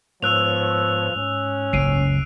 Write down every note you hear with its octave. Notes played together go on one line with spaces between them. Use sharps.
G#2 F3 B3 C#5 E6 F#6 F7
G#2 C#4
F#1 C#2 C7 D7 D#7